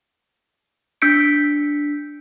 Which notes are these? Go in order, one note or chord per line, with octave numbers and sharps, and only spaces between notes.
D4 E6 G6 B6 C#7 D7